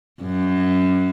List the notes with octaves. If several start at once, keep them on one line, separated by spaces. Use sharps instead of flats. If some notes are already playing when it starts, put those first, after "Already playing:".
F#2